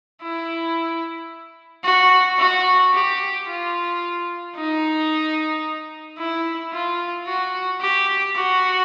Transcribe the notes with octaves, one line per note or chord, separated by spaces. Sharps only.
E4
F#4
F#4
G4
F4
D#4
E4
F4
F#4
G4
F#4